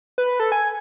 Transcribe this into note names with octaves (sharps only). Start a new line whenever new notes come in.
B4
A4
G#5